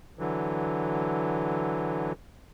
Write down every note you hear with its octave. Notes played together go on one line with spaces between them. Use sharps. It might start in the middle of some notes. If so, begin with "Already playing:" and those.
D3 E3 F#3